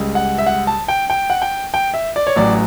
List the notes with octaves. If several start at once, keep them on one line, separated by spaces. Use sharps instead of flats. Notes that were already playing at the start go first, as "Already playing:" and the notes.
Already playing: C#2 C#3 G3
F#5
E5
F#5
A5
G5
G5
F#5
G5
G5
E5
D5
C#5
A1 A2 F#3 D5